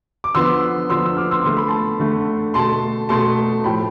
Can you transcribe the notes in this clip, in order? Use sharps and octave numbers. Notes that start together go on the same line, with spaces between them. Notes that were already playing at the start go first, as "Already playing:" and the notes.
D6
D3 F3 B3 C6 E6
D3 F3 B3 C6 E6
E6
D6 F6
C6 E6
D3 A3 C6
B5
A5 C6
D3 A3
B2 A3 A5 C6
B2 A3 A5 C6
A2 F3 A3 G5 B5